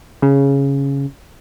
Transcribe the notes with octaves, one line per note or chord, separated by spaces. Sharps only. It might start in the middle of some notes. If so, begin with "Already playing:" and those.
C#3